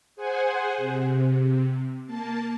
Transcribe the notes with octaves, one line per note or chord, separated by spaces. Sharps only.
G#4 C5 F#5 G#5
C3
A#3 A5